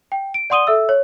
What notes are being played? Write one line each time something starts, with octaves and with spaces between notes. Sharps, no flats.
G5
D7
D5 F#5 C6 D#6 D#7 G7
A4 E5 E6
C#5